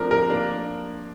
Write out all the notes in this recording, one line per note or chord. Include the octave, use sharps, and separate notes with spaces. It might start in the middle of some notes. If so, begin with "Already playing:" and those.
Already playing: F3 A3 C4 D4 A#4
A#4
A#3 D4